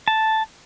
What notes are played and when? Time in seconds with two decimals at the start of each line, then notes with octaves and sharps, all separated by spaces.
0.08 A5